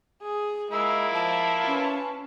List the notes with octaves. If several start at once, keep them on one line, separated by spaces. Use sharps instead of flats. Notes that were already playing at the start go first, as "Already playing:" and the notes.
G#4
G#3 A#3 E4 F4 A#5 E6
F3 A5
C#4 B4